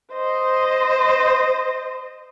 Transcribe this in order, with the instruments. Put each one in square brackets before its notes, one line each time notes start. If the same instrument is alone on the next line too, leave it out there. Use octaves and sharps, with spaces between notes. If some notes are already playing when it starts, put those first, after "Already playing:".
[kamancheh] C5 D#5